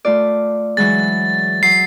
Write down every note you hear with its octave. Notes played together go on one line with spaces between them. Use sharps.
A3 F4 D5
E3 F#3 G#3 A6
F#3 C7